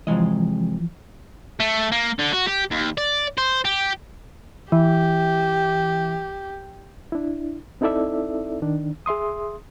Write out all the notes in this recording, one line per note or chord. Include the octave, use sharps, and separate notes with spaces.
C3 E3 F3 G#3 D#5
A3
A#3
D3
F#4
G4
D#2
D5
C5
G4
E3 G4
D4 E4
C4 D#4 E4 A4 D5 E5
D#3 D4
G#4 E5 C6 D#6